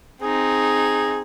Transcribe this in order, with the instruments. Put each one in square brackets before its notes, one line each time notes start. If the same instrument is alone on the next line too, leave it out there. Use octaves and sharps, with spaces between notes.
[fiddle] C4 D#4 [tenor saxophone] G#4